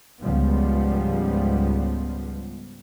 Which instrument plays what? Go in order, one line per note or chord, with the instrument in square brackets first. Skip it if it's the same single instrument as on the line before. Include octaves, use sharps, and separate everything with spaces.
[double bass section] C#2 G#2 F3 G3 B3